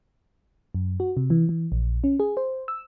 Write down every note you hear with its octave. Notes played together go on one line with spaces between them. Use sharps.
F#2
F#4
C3
E3
E3
A#1
C#4
G#4
C5
E6